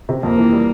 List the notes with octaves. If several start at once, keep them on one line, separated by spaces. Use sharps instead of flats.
C3
F2 A#3
E3
G3